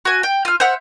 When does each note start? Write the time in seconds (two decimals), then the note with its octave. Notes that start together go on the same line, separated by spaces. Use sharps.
0.05 F#4 G#5
0.23 G5
0.45 F4 F6
0.60 C5 E5 F#5 F6